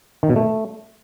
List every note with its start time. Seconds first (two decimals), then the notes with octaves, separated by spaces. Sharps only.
0.23 D#3
0.29 B2
0.36 A3